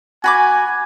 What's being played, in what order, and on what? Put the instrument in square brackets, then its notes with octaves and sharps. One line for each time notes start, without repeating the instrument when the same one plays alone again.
[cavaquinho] F#4 B5 D6 [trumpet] G#5